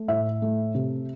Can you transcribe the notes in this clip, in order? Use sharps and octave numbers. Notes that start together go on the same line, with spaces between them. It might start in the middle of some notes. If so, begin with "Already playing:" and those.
Already playing: A3
A2 E5
A3
C3